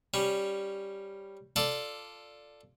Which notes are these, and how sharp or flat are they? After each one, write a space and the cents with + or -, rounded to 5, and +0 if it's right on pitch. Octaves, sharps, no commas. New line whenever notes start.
G3 +0 C#4 +0
F4 +0 A4 +0 D5 +0